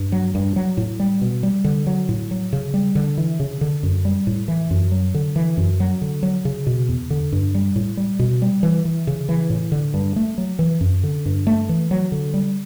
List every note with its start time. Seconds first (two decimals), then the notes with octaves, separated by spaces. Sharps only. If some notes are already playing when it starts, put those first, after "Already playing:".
Already playing: G2
0.12 F#3
0.35 G2
0.56 F#3
0.77 A2
1.00 G3
1.21 B2
1.43 G3
1.64 D3
1.87 F#3
2.09 A2
2.31 F#3
2.53 C#3
2.74 G3
2.95 D3
3.18 E3
3.40 C#3
3.61 D3
3.83 F#2
4.05 G3
4.27 A2
4.48 E3
4.71 F#2
4.92 F#3
5.14 D3
5.36 E3
5.57 F#2
5.80 F#3
6.02 D3
6.23 F#3
6.45 C#3
6.67 B2
6.89 E2
7.10 D3
7.32 G2
7.55 G3
7.76 A2
7.97 G3
8.19 B2
8.42 G3
8.63 E3
8.85 E3
9.07 C#3
9.29 E3
9.50 A2
9.72 D3
9.94 G2
10.16 A3
10.38 F#3
10.59 E3
10.81 F#2
11.03 D3
11.26 G2
11.47 A3
11.69 E3
11.91 F#3
12.12 D3
12.34 G3